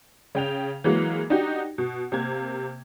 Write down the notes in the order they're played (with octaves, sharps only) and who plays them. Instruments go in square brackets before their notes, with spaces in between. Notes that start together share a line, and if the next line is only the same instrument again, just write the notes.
[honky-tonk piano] C#3 G5 F7
E3 F#3 G#3 A#3
D4 D#4 F#4 G4
B2
C3 A#3 G#6